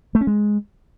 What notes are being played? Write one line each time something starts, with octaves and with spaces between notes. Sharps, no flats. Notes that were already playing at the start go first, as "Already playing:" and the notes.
A3
C#4
G#3